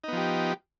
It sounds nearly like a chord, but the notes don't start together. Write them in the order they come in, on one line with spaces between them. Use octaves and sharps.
D#4 B3 F3 G4